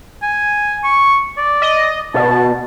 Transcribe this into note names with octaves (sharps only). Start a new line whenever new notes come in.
G#5
C#6
D5
D#5
B2 A5